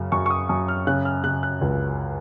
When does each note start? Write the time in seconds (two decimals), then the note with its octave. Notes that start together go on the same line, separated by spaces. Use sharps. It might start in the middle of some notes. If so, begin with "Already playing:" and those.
Already playing: F#2 C#3
0.12 F#2 C#6
0.26 C#6
0.30 D#6
0.49 F#2 D#6
0.68 F6
0.87 C#3 F#6
1.05 F6
1.24 C#3 F#6
1.43 F#6
1.61 C#2